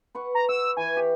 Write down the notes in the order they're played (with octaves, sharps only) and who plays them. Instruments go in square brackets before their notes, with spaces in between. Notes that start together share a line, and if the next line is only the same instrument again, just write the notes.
[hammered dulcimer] B4 F#5 C#6
[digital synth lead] A#5
[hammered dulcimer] F#5 [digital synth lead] E6
[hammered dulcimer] E3 [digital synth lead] G#5
[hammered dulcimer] G4